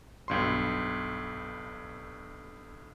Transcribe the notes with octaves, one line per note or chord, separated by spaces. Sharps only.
B1 G2 C6